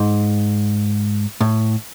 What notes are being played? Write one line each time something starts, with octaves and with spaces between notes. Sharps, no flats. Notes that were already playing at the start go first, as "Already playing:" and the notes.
Already playing: G#2
A2